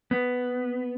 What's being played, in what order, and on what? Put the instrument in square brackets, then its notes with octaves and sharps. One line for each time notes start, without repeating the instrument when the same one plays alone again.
[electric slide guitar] B3